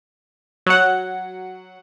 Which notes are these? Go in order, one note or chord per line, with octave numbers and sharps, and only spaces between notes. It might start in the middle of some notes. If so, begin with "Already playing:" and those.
F#3 F#5